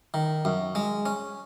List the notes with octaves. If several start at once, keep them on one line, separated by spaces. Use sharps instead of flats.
D#3
F#2
G#3
C#4